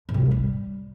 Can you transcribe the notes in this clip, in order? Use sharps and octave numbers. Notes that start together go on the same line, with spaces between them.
G#2
C3
G3
A2
G3